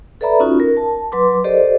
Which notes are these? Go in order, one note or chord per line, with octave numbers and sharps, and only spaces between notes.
A4 B4 D5 E5 A#5 B5
C#4 D#4 F4 F#4
A#4
A5
F#3 B4 C6 D6
G4 A4 A#4 C5 D5 D#5